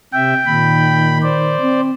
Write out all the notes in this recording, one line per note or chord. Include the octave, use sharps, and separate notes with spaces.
C3 E5 G5
A#2 D#3 B5
C5 D5
C4